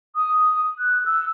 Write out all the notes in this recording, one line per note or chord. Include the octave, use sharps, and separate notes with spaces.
D#6
F#6
E6